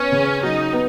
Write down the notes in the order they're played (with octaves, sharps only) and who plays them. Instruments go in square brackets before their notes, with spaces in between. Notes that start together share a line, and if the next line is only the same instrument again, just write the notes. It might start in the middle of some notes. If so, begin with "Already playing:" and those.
Already playing: [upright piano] B3 [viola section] C#4
[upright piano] C#3
[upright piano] F#3 [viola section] D#4
[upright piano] B3